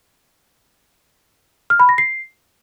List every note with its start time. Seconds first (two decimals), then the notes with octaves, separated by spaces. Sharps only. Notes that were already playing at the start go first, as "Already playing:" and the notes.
1.70 F6
1.80 B5
1.89 A#6
1.98 C7